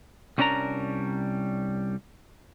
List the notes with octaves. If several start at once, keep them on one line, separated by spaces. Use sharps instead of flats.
C2 G3 C#4 D4 A#4 A#5